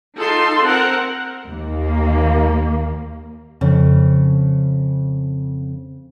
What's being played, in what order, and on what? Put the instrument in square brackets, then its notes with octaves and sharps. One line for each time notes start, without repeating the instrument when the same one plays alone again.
[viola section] D#4 F4 A4 C6
C4 A#4 F#5
[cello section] D#2 A#3
[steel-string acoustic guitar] F2 C#3